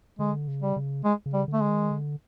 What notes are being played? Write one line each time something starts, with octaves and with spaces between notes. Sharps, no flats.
D3 G#3
C#3
G3
C#3
G#3
C#3
G3
D3
A3
G#3
D#3
D3